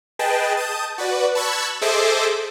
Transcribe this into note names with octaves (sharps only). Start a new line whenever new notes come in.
G#4 B4 D#5 G5 A5
A5 D#6 G6
F#4 B4 D5
A5 B5 C#6 E6 F#6 G#6
G#4 A4 C5 D#5 E5 D6